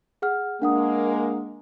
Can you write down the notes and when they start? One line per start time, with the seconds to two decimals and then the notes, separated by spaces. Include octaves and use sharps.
0.22 G#4 F#5 F6
0.62 G#3 A#3 D4 F#5 D#6